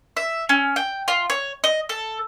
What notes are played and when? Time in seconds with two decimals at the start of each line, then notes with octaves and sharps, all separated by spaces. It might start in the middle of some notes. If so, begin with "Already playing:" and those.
0.17 E5
0.49 C#4
0.76 G5
1.08 F4
1.30 C#5
1.64 D#5
1.89 A4